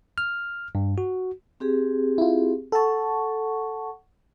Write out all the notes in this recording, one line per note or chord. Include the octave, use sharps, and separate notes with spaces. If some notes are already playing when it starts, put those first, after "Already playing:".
F6
G2
F#4
C4 G4 G#4
E4 F4
A4 F#5 A5 C#6